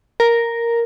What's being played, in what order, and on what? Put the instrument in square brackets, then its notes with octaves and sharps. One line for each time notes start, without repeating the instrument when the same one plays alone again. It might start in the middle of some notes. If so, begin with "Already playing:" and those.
[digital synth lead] A#4